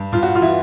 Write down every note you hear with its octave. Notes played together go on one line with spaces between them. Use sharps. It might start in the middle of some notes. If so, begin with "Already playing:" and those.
Already playing: G2
G2 F4
F#4
F4
E3 E4